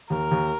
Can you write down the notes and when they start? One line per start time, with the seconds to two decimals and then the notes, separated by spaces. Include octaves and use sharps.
0.10 D#2 A#4
0.31 D#2